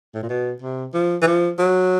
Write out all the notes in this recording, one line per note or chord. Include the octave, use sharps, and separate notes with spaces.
A2
A#2
B2
C3
F3
E3
F3
F#3